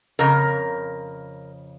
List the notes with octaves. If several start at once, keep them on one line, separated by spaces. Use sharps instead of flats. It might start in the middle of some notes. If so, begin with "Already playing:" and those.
F2 C#3 A#4